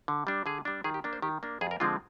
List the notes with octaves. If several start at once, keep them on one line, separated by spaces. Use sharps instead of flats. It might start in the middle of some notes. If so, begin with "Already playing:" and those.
D3
G3 D4
D3 G#4
G3 D4
D#3 G#4
G4
A#3 D4
C5
D#3 G4
A#3 D4
F2 G#4
A#4
D3 F3 G#3 C4 F4